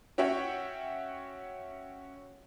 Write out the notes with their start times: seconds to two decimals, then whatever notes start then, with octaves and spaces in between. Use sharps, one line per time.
0.18 C#4 F#4 C#5 E5 F#5 G5